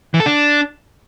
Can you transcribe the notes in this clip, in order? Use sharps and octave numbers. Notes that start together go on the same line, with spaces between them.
E3
A4
D4